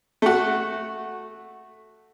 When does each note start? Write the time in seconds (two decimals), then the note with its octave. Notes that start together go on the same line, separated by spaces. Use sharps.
0.22 A3 F#4